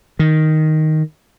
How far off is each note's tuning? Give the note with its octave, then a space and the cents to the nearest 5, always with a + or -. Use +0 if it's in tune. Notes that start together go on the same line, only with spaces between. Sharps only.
D#3 +0